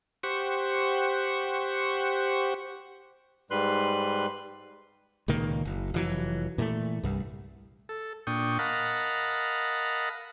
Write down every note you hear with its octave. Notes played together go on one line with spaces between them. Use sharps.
G4 C5 F#5 C#6
G#2 G3 B4 C6 F#6
C#2 A#2 D#3 A#3
F#1
F1 E3 F#3
A#2 E3 G3 A3
C2 G2
A4
A#2 D4 G5 C#6 D#6
A#4 D#5 F5 F#5 A5 B5